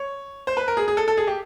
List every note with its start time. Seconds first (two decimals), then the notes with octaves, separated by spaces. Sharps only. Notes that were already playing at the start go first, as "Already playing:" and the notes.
Already playing: C#5
0.47 C5
0.57 B4
0.68 A#4
0.77 G#4
0.88 G#4
0.97 A4
1.08 A4
1.17 G#4
1.27 G4